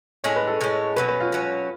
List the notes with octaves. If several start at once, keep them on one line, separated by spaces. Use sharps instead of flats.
A2 G#3 C#4 C#5
B4
A4
A2 G#3 C#4
B2 F#3 C#4 B4
B4
F4
B2 F#3 C#4